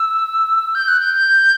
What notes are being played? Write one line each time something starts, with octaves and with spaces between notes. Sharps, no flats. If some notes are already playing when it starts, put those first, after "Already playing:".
Already playing: E6
G6
F#6
G6